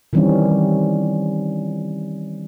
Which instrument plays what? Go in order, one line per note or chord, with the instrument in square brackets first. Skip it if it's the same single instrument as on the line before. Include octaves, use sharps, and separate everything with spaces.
[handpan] D#3 E3 G3 C4 C#4